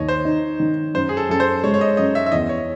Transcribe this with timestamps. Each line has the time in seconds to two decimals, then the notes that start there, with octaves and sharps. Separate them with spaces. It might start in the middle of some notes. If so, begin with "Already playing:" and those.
Already playing: D#2 C#5 D#5
0.08 C5
0.25 D#4
0.60 D#3
0.94 F#2 C5
1.09 G#4
1.17 A4
1.29 F#2 A4
1.40 C5
1.63 G#3 C#5
1.74 C#5
1.81 D#5
1.97 F#2 D#5
2.15 E5
2.26 E5
2.32 E2 D#5
2.49 C#5